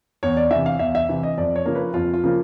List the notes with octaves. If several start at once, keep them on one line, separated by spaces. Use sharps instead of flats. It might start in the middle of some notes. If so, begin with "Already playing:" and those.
E2 C#5
D5
C3 E3 E5
F5
E2 E5
E5
C3 E3
D#5
F2 D5
C#5
C#3 F3 A#3
B4
F2 F4
F4
C#3 F3 A#3